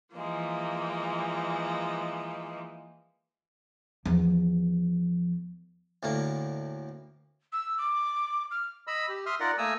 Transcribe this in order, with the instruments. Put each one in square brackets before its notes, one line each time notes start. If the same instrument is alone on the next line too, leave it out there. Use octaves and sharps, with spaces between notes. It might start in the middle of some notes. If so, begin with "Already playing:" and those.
[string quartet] E3 F3 G#3 A#3
[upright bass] E2 F3
[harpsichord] D2 A2 A#3
[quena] E6
D6
F6
[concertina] D#5 B5 E6
G4
E5 C6 D#6 F6
D#4 F4 A#4 D5 D#5 F#5
A3 A#3 G#5 A#5 D#6 E6